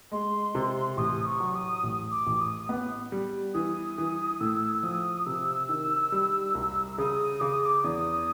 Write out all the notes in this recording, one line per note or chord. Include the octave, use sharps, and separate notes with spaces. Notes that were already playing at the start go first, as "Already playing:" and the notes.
G#3 C6
C3
A1 D#6
C#6
F#3
D#6
A1
D6
A1
D#6
B3
G3
E3 D#6
E3
A2 E6
F3 D#6
C3 E6
D#3
G3
C2
C#3 D#6
C#3 D6
D#6
D6
E2 D#6